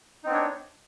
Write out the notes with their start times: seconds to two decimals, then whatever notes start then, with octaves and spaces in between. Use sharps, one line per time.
0.24 D#4
0.26 C4
0.29 B3
0.32 D4
0.34 C#5